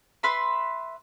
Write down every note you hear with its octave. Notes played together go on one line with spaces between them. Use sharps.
B4 E5 B5 C6